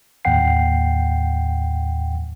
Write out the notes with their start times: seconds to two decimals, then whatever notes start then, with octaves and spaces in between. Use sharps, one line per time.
0.25 D#2 A2 F#5 G5 C7